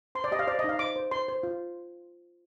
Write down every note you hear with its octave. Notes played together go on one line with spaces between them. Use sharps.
C5 C6
D5
G4 D#5
F5
C5 D5
D#5
D#4 F5
C5 D6
C5
C5 C6
C5
F4